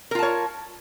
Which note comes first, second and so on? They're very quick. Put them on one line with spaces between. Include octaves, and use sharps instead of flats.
A#4 F4 A5 C#5